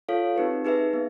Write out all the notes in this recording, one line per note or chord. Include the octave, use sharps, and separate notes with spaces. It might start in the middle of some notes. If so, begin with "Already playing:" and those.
F4 A4 C#5 F5
C4 D#4 G4 B4
D#4 G#4 B4 E5
B3